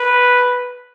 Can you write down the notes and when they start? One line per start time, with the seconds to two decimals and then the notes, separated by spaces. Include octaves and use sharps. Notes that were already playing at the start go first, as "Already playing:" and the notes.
Already playing: B4